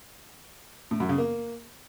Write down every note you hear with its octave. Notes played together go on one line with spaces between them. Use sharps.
A2
F#2
C#3
A#3